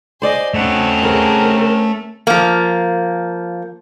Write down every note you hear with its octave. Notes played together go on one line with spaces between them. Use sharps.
C5 D5 D#5 G#5 C6
A3 C4 C#4 F#5
G#4 A#4 B4 C#5
F3 A#3